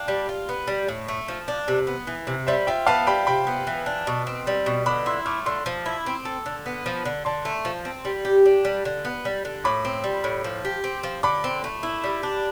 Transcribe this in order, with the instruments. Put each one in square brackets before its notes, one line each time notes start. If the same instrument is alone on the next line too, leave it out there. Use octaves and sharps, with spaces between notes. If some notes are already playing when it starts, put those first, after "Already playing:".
Already playing: [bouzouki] D4 [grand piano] F5 G5
[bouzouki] G3
F4
B3
G3
A2
A3
F3
D4
C3
B3
E3
C3
[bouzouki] G3 [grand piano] C5 E5
[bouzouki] F4 [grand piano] E5 G5
[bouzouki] B3 [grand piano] F5 A5
[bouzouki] G3 [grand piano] G5 B5
[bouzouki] C3 [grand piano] G5 B5
[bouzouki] B3
E3
D4
B2
C4
G3
B2
[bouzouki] D3 [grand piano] B5 D6
[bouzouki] E4 [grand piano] C6 E6
[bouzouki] A3 [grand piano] D6 F6
[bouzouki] D3 [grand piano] C6 E6
[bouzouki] F3
E4
C4
A4
D3
B3
F3
D3
[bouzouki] D3 [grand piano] A5 C6
[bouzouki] A3
F3
C4
G3
G4
D4
G3
D3
B3
G3
D3
[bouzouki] A2 [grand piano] B5 D6
[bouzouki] C4
G3
A2
F3
G4
C4
F3
[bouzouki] D3 [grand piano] B5 D6
[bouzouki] C4
A3
E4
G3
D4